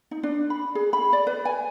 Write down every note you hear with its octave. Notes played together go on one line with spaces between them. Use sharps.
D#4
D4
B5
G#4
B5
D5
B4
G#5